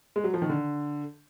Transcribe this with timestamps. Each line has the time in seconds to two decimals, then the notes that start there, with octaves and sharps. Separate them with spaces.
0.16 G#3
0.24 F#3
0.34 F3
0.42 D#3
0.49 D3